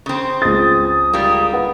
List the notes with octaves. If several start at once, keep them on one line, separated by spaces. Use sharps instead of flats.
C#3 C4
C#2 D#6 A6
G3 A#3
B4 F#5